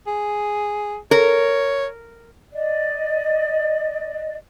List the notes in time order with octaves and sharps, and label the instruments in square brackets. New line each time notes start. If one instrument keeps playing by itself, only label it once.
[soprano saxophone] G#4
[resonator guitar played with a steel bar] A#4 [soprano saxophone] C#5
[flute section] D5 D#5